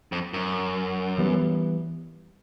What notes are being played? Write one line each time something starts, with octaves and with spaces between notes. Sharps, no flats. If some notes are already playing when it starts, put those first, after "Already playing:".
F2
F#2
E3 G3 B3